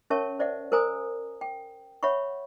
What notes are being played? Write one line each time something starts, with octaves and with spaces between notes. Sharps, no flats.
C#4 A#4 C#5 E5 A5 C#6
C5 D5 E5 F#5
A#4 C5 G#5 A#5 D#6
G5
C#5 E5 F#5 B5 C#6